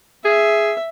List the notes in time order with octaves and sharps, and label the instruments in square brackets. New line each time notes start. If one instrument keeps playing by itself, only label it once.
[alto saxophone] G#4 [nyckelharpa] E5